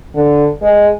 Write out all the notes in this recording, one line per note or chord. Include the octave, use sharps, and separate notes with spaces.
D3
G#3